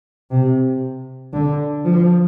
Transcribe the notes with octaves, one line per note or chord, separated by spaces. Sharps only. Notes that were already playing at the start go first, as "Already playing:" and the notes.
C3
D3
F3